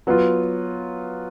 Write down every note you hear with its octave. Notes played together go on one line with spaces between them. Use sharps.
F#3 B3 F4